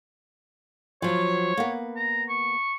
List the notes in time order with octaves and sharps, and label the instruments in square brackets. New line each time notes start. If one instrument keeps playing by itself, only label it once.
[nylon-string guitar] F3 F#3 [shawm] C#5
[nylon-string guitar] A#3 B3
[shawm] A#5
C#6